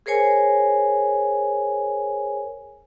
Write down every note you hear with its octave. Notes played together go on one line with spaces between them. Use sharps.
G#4 A#4 C5 C#5 G#5